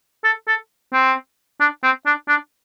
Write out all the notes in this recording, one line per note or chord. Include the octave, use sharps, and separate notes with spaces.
A4
A4
C4
D4
C4
D4
D4